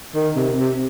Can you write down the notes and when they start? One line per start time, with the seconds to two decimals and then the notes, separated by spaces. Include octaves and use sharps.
0.15 D#3
0.36 C3
0.58 C3